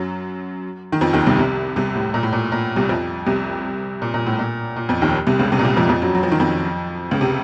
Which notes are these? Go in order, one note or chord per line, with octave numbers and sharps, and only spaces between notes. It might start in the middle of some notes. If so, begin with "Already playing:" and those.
Already playing: F#2 F#3
D#3
F2 F3
D#2 D#3
C2 C3
C2 C3
C2 C3
A2
A#2
A2
A#2
A#2
C2 C3
F2 F3
C2 C3
A#2
A#2
A2
A#2
A#2
F2 F3
D#2 D#3
C2 C3
C#2 C#3
C2 C3
A#2
C2 C3
F2 F3
F2 F3
F#2 F#3
F#3
F3
D#3
F2 F3
C#2 C#3
C3